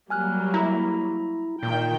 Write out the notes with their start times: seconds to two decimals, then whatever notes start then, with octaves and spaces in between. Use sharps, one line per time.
0.10 F#3 G3 A#3 G#5 F6 F#6
0.54 E4 A#5
1.63 A#2 D#3 G5